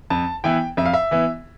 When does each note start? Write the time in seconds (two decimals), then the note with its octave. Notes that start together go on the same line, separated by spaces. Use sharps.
0.10 F2 A5
0.44 E3 B3 E4 G5
0.77 F2 E5
0.86 F5
0.93 E5
1.11 E3 B3 E4